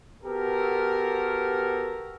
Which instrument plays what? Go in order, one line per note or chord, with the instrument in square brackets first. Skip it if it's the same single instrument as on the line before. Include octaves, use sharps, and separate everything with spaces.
[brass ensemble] B3 F#4 G4 A4 A#4